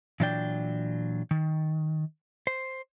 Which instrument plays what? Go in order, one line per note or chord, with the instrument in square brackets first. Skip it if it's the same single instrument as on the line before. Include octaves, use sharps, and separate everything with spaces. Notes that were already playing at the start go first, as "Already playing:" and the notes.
[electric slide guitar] A#2 E3 F#3 D4 D5 G5
D#3
C5